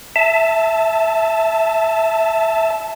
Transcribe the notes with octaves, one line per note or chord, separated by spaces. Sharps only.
E5 A5